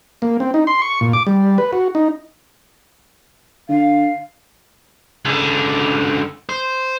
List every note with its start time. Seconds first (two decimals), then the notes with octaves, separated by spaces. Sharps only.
0.22 A#3
0.40 C4
0.54 D#4
0.67 C6
0.82 C#6
1.01 A#2
1.13 D6
1.27 G3
1.58 B4
1.73 F#4
1.95 D#4
3.69 D3 F5
5.25 C#2 D3
6.49 C5